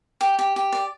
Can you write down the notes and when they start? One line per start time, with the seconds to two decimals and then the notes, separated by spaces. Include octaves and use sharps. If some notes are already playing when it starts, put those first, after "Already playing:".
0.21 G4
0.39 G4
0.56 G4
0.73 D5